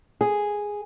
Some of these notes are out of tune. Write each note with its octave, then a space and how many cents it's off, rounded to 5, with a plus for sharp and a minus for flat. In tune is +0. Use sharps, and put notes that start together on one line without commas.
G#4 -5